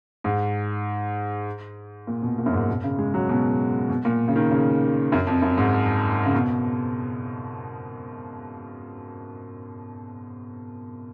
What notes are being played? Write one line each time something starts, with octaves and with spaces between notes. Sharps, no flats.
G#2
A#2
B2
A#2
F#2
G#2
B2
C#3
G#3
F#3
B2
B2
A#2
C#3
D#3
C#3
F#2
F2
F#2
G#2
C#3
B2